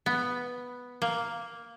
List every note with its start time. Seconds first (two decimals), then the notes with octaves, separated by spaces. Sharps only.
0.06 B3
1.02 A#3